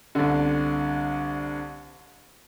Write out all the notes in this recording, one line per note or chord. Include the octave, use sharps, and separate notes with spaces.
C2 D3